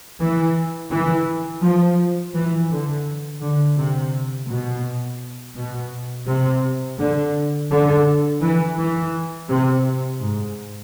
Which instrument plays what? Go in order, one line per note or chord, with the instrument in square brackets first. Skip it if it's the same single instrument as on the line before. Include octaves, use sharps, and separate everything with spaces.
[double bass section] E3
E3
F3
E3
D3
D3
C3
B2
B2
C3
D3
D3
E3
E3
C3
G#2